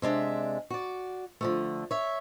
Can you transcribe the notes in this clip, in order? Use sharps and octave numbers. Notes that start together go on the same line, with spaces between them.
C3 G#3 D4 E5
F#4 D5
D3 F3 A3
C#5 E5